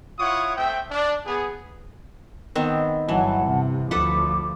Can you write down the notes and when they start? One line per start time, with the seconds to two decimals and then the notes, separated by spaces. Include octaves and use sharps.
0.19 E4 F4 C#5 F#5 C#6 D#6
0.57 A3 C4 E5 G5
0.91 D4
1.26 B3 G#4
2.55 D#3 B3 C4
3.09 G1 E3 F#3 F#5 A5
3.46 C3
3.91 D2 F3 A4 B4 F#5 D6